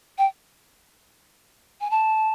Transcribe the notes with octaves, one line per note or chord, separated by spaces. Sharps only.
G5
G#5
A5